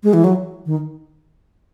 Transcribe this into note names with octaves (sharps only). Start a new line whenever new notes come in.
G#3
E3
F#3
D#3